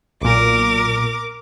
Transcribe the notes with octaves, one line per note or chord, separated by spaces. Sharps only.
B1 A#2 A#4 D6